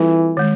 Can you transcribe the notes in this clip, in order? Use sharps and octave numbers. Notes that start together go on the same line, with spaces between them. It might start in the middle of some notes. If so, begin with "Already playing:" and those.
Already playing: E3 G3 C4 F4 A4
D#3 G#3